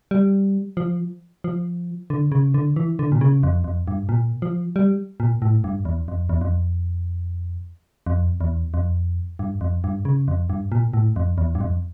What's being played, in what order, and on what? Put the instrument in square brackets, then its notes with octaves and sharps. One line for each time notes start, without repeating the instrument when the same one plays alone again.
[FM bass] G3
F3
F3
D3
C#3
D3
E3
D3
A#2
C#3
F2
F2
G2
A#2
F3
G3
A#2
A2
G2
E2
F2
E2
F2
F2
E2
F2
G2
F2
G2
C#3
F2
G2
A#2
A2
F2
E2
G2
F2